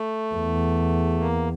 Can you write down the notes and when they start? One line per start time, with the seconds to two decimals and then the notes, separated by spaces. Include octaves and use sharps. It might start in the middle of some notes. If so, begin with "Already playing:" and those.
Already playing: A3
0.35 E2
1.19 A#3